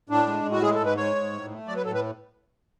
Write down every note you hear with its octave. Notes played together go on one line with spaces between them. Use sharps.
A2 D4
G#3
A2
F#4
G#3 G#4
A4
G#2
B4
G#3 C#5
G#2
A2
A3
F#3 D5
B4
A2 A4
B4